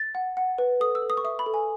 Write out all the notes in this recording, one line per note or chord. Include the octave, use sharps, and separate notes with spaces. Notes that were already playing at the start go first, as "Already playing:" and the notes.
Already playing: A6
F#5
F#5
B4
A4 D#6
E6
A4
D#6
C#6
E5 D#6
B5
A4
G#5